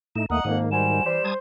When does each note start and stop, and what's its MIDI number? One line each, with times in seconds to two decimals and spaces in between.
0.16 0.26 45
0.16 0.26 57
0.16 0.26 63
0.16 0.25 100
0.30 0.40 39
0.30 0.40 57
0.30 0.40 58
0.30 0.43 75
0.30 0.58 78
0.30 0.43 82
0.30 0.43 87
0.44 0.62 41
0.44 1.01 44
0.44 1.01 51
0.44 0.68 58
0.71 1.01 55
0.71 1.03 66
0.71 1.03 72
0.71 1.03 80
0.71 1.26 100
1.05 1.18 52
1.05 1.24 55
1.05 1.24 67
1.05 1.24 72
1.24 1.33 55
1.24 1.37 72
1.24 1.34 81
1.24 1.34 87
1.24 1.34 92